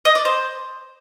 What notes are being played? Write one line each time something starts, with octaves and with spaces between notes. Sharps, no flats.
D#5
D5
C5